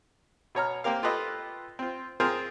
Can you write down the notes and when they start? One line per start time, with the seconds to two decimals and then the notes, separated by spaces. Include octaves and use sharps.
0.55 B2 C#5 A#5 F6
0.84 A#3 C4 G4 A#4 F5
1.03 F4 G4 A4 B4 D#5
1.79 C4 F4
2.20 C4 F4 G#4 A#4 C5